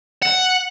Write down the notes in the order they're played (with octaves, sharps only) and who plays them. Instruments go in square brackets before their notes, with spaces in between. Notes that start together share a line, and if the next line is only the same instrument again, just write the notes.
[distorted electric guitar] F#5